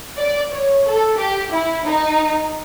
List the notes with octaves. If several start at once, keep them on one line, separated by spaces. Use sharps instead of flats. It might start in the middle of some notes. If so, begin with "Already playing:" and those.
D5
C#5
A4
G4
E4
D#4